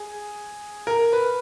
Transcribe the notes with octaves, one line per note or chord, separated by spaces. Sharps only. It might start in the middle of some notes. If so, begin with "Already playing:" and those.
Already playing: G#4
A#4
B4